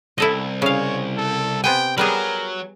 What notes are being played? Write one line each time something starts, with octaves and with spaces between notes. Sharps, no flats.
C2 E4 A4 D#5
C#3 C#5 F5
A4
C3 B3 G5 G#5
F#3 G3 B3 G#4 A#4